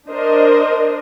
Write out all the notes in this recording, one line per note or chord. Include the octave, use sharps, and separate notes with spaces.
D4 A#4 C5 D#5